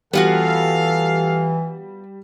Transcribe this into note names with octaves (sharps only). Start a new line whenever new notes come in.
E3 G3 B3 F4 F#4 A4 F5